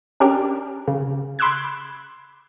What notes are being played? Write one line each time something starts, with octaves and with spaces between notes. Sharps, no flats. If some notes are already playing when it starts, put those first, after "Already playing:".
C#4 D4 G4 A#4
C#3
B5 C6 D6 E6 F#6 G#6